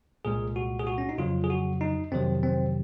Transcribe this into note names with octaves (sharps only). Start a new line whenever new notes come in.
C2 A#2 G#3 G#4
F#4
G#4
F#4
C#4
D#4
F2 C#3 F#3 F4
G#4
F#4
D#4
F2 C3 D#3 F#3 C4
C4